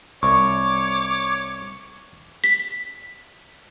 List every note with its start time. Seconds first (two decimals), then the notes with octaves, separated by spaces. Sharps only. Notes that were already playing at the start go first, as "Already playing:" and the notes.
0.23 C2 C#5 C#6 D6
2.44 B6